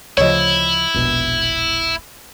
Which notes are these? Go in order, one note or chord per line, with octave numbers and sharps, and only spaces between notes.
D2 C#3 F3 E4 C#5 D#5
E1 A#1 B2